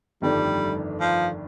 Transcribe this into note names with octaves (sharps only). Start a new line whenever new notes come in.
G1 F2 D#3 G3 A3 D4
F3